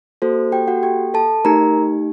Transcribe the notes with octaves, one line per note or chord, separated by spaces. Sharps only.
A#3 F#4 A4 C5
G4 G5
F#4 F#5
G4 G5
A4 A5
A3 D#4 G4 A#4 A#5